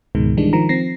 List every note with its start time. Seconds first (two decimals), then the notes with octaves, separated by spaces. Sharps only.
0.15 C#2 G#2 B2 D#3 G#3
0.37 D#3 E3 G3 G#3 D4
0.53 D#3 F3 A#5
0.69 F3 C4 A#6 C7